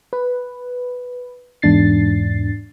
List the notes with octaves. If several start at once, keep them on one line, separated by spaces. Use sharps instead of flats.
B4
E2 G#2 D4 A6 C7